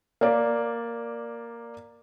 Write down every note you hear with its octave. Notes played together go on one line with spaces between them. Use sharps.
A#3 D5